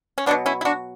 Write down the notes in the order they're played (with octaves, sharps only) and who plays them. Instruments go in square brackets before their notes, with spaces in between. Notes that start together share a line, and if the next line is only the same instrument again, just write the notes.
[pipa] C#4
B2 F#3 B3 D4
C#4 E4
E4
D4 F#4